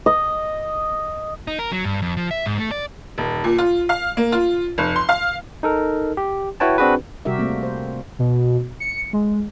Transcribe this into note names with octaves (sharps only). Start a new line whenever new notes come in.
D#5
D#4
A#4
F#3
G2
F2
F3
E5
G#2
A3
D5
D#1
A#2
F4
F5
A#3
F4
F1
C6
F5
D#4 A4 A#4
G4
E4 F#4 B4 C#5 G5 A5
C4 D4 F#4 G#4 B4
C3 G3 F#4 G4 A#4 E5
A3 A#3 C4
C5
B2
C#7
G#3